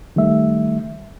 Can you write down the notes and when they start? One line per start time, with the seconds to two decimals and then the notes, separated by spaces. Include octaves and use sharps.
0.16 D#3 G3 A3 E5